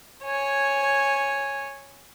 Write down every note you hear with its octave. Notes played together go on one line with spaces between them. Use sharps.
C#5 G#5